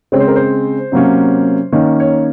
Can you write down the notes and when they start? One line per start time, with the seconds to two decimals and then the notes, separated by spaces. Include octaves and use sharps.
0.12 C#3 G#3 C4 C#5
0.20 C5
0.28 A#4
0.36 C5
0.92 C3 F#3 A#3 C#4
1.72 D#3 A#3 C#4 C#5
2.00 C#5